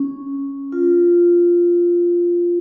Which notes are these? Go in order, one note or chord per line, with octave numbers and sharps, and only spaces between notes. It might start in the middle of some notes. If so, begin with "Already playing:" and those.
Already playing: C#4
F4